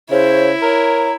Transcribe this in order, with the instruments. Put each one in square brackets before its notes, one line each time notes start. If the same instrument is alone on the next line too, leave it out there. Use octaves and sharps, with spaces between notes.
[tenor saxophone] C#3 [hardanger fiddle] E4 [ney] C5 [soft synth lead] C#5
[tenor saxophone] A#4 [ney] C#5 [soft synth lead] A#5